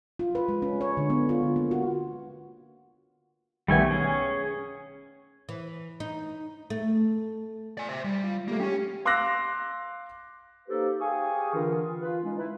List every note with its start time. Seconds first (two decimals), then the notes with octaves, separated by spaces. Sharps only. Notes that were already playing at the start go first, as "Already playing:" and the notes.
0.19 F4
0.35 B4
0.48 G#3
0.62 C#4
0.81 C#5
0.97 D3
1.10 B3
1.29 F4
1.43 D3
1.56 A#3
1.71 F#4
3.68 B1 D#3 G3 A3 B3 G#5
3.91 C#4 G#4
5.49 E3
6.00 D#4
6.70 A3
7.77 D5 G#5
7.89 C5 E5
8.04 G3
8.24 F4
8.48 G3 A3 A#3
8.60 C#4 G4 C#5
9.05 F5 C6 D6 E6 F#6 A#6
10.68 A#3 D#4 G4 A4 B4 C5
11.01 G4 G#4 F5 G#5 C#6 D#6
11.54 D3 E3 D4 F4 A#4
12.01 F4 B4
12.24 G#3 C#4 D#4
12.37 E4 B4